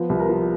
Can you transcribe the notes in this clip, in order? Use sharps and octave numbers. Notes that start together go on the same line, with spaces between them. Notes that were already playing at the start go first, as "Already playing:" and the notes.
Already playing: F3 B3
C2
A#4
F3